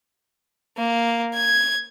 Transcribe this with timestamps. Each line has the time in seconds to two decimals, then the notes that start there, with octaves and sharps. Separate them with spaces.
0.77 A#3
1.34 G#6